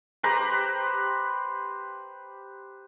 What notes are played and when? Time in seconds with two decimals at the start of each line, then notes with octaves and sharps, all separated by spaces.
0.23 G4 B4 C5 A#5